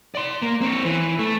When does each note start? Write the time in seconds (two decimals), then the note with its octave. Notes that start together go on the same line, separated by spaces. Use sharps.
0.15 D5 C6
0.42 A#3
0.61 C4 C#5
0.85 E3
1.19 A3